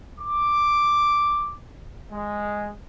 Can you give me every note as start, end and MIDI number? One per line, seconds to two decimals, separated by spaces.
0.19 1.54 86
2.12 2.71 56